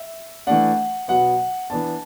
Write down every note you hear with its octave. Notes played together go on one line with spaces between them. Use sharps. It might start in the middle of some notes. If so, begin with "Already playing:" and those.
Already playing: E5
E3 A3 D4 F#5
B2 F#3 B3 F#5
E3 B3 D4 A5